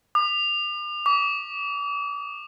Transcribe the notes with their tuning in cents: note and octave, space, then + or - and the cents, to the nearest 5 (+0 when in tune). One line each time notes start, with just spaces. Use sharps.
D6 +45
D6 -40